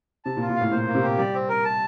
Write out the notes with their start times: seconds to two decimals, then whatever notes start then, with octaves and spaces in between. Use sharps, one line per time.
0.25 C3 A5
0.37 A#2
0.42 F4
0.49 A#2
0.56 A2 F5
0.72 A#2 C5
0.87 A#3
0.95 C3
1.03 G4
1.18 G3 D5
1.34 C4
1.49 A#4
1.65 A5